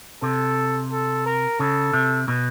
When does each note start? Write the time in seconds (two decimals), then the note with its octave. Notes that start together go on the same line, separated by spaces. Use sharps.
0.22 C3 A4
0.92 A4
1.26 A#4
1.60 C#3 A4
1.93 C3
2.28 B2